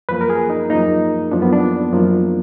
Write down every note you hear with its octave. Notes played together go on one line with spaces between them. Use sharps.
F#2 F3 A#3 B4
A#4
G#4
D#4
F#2 F3 A#3 D#4
F#2 F3 A#3 D4
B3
D4
F#2 F3 A#3